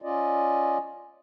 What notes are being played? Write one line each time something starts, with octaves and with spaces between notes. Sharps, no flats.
C#4 F4 D5 D#5